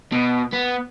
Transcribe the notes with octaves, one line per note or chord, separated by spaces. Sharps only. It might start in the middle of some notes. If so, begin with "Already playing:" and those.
B2
B3